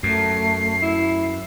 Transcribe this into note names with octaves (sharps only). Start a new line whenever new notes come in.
F#2 A3 C7
E4